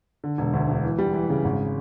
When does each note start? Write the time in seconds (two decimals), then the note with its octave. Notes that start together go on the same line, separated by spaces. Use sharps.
0.24 D3
0.38 E1
0.53 D2
0.69 E1
0.84 E3
0.98 G3
1.14 E3
1.30 C#3
1.45 G#1